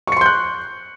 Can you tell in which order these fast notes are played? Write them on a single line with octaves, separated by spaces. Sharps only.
C#6 C#7 C6 G6 F#6